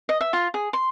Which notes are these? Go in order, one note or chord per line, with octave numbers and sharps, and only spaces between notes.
D#5
E5
F4
G#4
C6